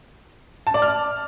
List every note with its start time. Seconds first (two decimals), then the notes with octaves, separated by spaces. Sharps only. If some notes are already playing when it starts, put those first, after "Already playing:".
0.67 A5
0.74 D5
0.82 F6